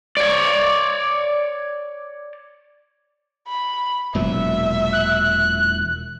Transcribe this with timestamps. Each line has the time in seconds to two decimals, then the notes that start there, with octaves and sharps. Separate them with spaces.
0.17 C#5 D5
3.48 B5
4.15 E1 A#2 F#3 E5
4.93 F#6